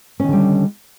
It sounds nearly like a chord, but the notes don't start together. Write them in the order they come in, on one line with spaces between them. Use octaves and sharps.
C#4 D#3 D3 G3